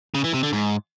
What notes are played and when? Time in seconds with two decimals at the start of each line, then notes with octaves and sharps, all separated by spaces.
0.14 C#3
0.24 E3
0.34 C3
0.43 D3
0.53 G#2